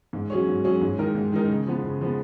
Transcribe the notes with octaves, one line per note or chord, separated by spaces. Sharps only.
G#2
F#3 C#4 G#4 C#5
G#2
F#3 C#4 G#4 C#5
G#2
D#3 G#3 D#4 A#4
G#2
D#3 G#3 D#4 A#4
C#3
F3 G#3 B3
C#3
F3 G#3 B3